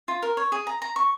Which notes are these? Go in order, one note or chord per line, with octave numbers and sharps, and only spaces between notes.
F4
A#4
C#5
G#4
A#5
A#5
C#6